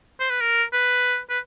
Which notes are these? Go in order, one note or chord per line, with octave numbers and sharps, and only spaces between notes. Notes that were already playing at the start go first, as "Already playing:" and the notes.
C5
B4
A#4
B4
B4